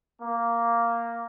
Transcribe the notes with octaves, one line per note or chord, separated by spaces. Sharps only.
A#3